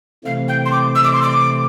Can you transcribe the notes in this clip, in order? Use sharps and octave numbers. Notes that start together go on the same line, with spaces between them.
C3 E3 A3 C4 E4 F5
G5
C6
D6
E6
D6
C6
D6